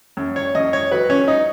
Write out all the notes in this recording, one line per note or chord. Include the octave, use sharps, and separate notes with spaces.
F#2
C#5
F#2 D#5
C#5
F#3 B4
C#4
D#4